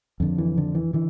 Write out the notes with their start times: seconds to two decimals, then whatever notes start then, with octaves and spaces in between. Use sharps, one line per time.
0.20 F2 D3
0.38 E3
0.57 D3
0.75 E3
0.93 D3 E3